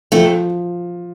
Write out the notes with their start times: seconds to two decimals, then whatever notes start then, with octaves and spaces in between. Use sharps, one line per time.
0.12 F3 A3 C4